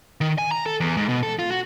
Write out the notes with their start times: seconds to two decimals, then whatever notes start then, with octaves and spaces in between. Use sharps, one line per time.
0.21 D#3
0.38 G#5
0.51 A#5
0.66 A4
0.80 E2
0.97 G#2
1.09 B2
1.23 A4
1.39 F4
1.51 F#4